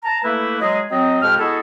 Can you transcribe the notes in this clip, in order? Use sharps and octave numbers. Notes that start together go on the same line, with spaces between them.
A5 A#5
A3 A#3 E4 B4
F#3 G#3 G#4 D#5
F#3 C4 D#5
F2 B2 G#3 G4 G5 F6
G#3 B3 E4 F#4 G#4 A4